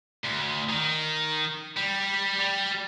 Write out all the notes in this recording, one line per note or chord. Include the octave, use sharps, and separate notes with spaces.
D2
D#3
G3
G3